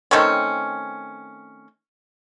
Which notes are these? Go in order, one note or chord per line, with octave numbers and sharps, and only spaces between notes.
D#3 A3 C4 C#4